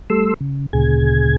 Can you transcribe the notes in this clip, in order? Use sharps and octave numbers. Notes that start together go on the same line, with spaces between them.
G3 A3 A4 C6 E6
C#3
D2 A#2 C#3 G#4 G#6